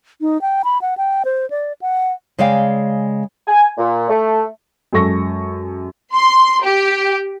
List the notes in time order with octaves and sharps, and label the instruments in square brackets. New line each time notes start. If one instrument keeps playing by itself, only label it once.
[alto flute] D#4
G5
B5
F#5
G5
C5
D5
F#5
[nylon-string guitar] C#3 G#3 D5 F5 G5
[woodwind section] G#5
A#2
A3
[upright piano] F#2 G#3 A4 C#6 A#6
[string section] C6
G4